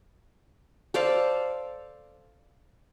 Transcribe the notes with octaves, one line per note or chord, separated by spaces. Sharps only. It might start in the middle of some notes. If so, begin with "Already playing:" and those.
A4 C5 D5 F5